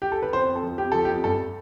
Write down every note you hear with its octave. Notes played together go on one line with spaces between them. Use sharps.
G4
A4
B4
F2 C5
F2
A4
F3
F2 G4
F3 A4
G4
F2
G2 A4